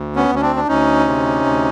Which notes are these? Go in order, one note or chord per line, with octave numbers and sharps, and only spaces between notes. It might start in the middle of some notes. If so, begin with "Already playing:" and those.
Already playing: D2
B3 C#4
D2
C#4
C4 D4
D4
D2 C#4 D#4
C3
D2